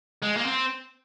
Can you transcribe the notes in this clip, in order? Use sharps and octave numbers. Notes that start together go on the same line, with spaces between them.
G#3
A#3
C4